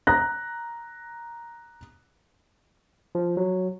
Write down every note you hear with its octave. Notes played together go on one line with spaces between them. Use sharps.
A#5 F#6 A#6
F3
F#3